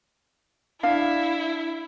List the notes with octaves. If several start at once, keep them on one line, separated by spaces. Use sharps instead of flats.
D4 E4 F5